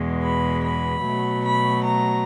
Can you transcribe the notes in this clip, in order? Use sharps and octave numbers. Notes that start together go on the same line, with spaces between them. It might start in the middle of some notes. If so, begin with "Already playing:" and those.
Already playing: E2 B2 G#3
B5
B5
B2 F#3 A3
B5
A#5